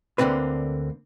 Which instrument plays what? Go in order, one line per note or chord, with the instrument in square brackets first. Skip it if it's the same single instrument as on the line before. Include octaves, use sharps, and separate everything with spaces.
[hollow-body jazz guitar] D2 D3 D#3 A#3 C4 B4